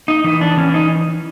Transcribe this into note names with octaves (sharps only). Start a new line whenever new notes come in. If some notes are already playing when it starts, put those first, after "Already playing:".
D#4
E3 D#4
D4
E3 C#4
D#4